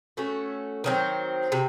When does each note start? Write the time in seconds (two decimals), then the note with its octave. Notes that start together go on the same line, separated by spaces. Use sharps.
0.17 A3 C#4 F#4
0.84 D#3 F#3 C4
1.52 C3